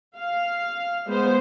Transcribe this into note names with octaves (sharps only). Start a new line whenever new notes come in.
F5
G#3 B3 C5